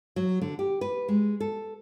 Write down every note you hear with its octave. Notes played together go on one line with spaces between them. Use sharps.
F#3
D3
G4
B4
G#3
A4